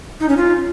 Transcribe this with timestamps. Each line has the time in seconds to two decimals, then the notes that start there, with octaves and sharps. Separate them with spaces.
0.20 D#4
0.29 C#4
0.37 F4